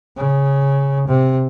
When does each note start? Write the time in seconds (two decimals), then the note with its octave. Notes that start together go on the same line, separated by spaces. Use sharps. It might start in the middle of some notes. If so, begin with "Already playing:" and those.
0.17 C#3
1.08 C3